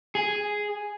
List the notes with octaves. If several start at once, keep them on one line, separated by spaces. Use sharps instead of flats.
G#4